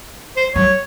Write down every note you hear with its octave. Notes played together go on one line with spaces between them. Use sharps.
C5
F#3 C#5